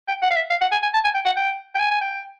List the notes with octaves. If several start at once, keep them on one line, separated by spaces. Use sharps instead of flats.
G5
F#5
F5
E5
F5
F#5
G#5
G#5
A5
G#5
G5
F#5
G5
G5
G#5
G#5
G5